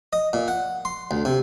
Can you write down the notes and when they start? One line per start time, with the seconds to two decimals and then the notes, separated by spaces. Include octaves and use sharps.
0.13 D#5
0.33 A#2
0.48 F#5
0.85 C6
1.11 D2
1.25 C3